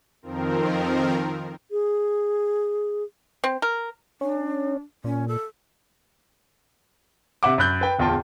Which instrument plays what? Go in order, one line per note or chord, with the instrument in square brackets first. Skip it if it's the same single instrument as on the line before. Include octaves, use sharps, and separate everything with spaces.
[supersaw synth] F2 D#3 F3 C4 A#4
[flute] G#4
[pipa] C4
A#4
[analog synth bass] C#4 [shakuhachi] D4
[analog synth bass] A#2 [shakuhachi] C#4
[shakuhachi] A4
[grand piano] C3 E5 F#5 D6
F#2 B5 F#6 G6
B4 G5
D1 E2 F4 G5 A5